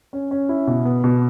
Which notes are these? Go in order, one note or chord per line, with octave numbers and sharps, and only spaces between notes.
C#4
C#4
E4
B2
B3
B2